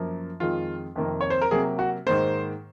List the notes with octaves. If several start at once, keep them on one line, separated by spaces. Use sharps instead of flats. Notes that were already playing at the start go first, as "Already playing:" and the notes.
Already playing: F#2 F3 A#3
F2 D#3 G#3 F4
F2 C3 D#3 A#3
C#5
C5
A#4
C3 F#3 A#3 G#4
F#4
G#2 D#3 A#3 C5